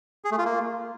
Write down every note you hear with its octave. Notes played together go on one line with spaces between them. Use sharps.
G#4
A3
F4
A#3